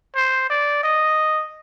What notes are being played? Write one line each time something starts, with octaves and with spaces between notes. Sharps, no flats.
C5
D5
D#5